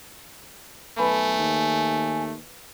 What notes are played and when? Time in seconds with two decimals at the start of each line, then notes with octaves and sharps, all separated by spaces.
0.98 B1 A3 B4 G#5 B5
1.38 D#2